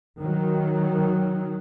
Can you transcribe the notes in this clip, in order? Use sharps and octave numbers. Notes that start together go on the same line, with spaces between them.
D#3 F#3